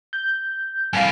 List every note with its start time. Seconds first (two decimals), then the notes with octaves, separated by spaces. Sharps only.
0.13 G6
0.93 C2 A2 F5 G#5